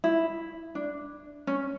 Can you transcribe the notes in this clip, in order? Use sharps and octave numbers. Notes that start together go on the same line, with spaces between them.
E4
D4
C#4